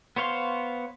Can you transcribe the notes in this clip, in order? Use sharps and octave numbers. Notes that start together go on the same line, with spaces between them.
B3 C5 C#5 F5 C6